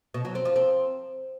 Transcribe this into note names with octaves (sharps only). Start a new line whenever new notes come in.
B2
F#3
C4
F3
C4